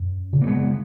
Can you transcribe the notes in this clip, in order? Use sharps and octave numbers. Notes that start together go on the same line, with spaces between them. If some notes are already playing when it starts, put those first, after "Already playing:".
Already playing: F#2
C#3
A#3
G#3 B3